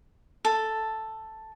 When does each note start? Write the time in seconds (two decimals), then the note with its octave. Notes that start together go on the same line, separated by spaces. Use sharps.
0.45 A4